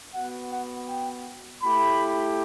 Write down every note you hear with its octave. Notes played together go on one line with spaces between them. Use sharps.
B3 F#4 F#5
F#5
G5
A3 E4 G4 B5